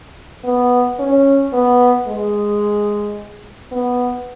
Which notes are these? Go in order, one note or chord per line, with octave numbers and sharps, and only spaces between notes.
B3
C#4
B3
G#3
B3